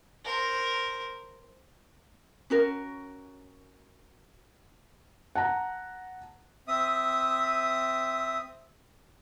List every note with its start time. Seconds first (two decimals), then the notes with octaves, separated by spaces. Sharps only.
0.24 A#4 C5
2.50 C#4 F#4 A#4
5.35 F#5 A5 A#5
6.68 C4 E5 D#6